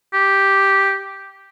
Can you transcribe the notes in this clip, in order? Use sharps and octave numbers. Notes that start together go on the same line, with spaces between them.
G4